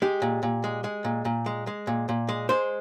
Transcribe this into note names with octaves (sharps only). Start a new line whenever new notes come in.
G#3 G4
A#2
A#2
G#3
G#3
A#2
A#2
G#3
G#3
A#2
A#2
G#3
G#3 C5